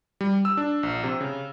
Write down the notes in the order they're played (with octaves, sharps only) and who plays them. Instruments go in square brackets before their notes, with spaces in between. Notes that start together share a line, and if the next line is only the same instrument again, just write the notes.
[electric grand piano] G3
E6
D4
A#1
C3
C#3